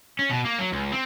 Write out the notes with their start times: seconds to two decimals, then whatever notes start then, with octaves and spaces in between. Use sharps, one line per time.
0.19 C#4
0.30 B2
0.45 A#3
0.58 F#3
0.72 C#2
0.92 C4